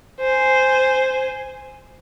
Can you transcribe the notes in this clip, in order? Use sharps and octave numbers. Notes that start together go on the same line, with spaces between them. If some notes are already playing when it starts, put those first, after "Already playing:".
C5 G#5